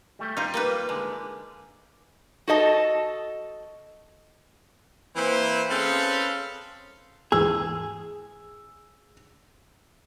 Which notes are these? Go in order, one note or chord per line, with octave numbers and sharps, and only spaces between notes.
G3 A3
G3 D#4 F4
A#3 D#4 B4
D3 G#3
F#4 A4 D#5 A5
E3 A#3 C4 E4 C5
C4 C#4 G#4 A4 B4 F5
D#2 G#2 E3 G#4 E6